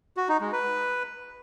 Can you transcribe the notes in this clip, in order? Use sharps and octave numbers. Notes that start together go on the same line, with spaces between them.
F#4
D#4
G#3
B4